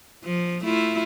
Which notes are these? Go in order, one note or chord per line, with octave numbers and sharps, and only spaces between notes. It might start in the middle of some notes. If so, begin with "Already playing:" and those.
F3
A3 E4 F4